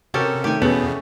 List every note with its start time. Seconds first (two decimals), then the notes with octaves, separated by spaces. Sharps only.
0.14 C3 C#4 F#4 G4 A4 A#4
0.44 D#3 A3 G4 G#5
0.62 E2 B2 A3 B3 C#4 F#4 G#4